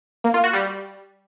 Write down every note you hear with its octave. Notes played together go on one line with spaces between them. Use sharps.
A#3
F4
F#4
G3